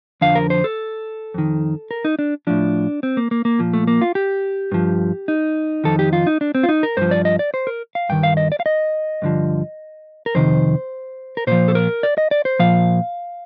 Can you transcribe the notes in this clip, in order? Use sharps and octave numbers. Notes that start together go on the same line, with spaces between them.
F2 D3 F3 F5
A#4
C5
A4
F2 D#3
A#4
D#4
D4
A2 F3 D4
C4
A#3
A#3
A#3
A#2 F3
A3
A#3
F4
G4
G2 F3
D#4
F2 D#3 A4
G4
F4
D#4
D4
C4
F4
D#4
A#4
G2 F3 C5
D5
D#5
D5
C5
A#4
F5
G2 D#3 G5
F5
D#5
D5
F5
D#5
G2 D3 F3
A#4
F2 C3 D#3 C5
A#4
A#2 F3 C5
A4
A#4
D5
D#5
D5
C5
A#2 F3 F5